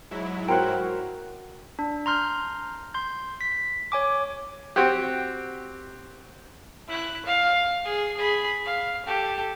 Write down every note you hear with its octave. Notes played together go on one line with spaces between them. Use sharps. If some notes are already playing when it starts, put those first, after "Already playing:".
G#2 F#3 E4
F#4 A#4 C5 F#5 G5
D4
A#5 C6 F6 G6
C6 G6
B6
C#5 G#5 D6
C4 F#4 G4
E4 F#6
F5
G#4
G#4 B5
F5
G4 A4